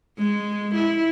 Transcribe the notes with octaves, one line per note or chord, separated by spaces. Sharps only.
G#3
E4